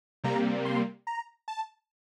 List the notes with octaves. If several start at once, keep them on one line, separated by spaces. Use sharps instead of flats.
C3 G3 A#3 A#5
C6
A#5
A5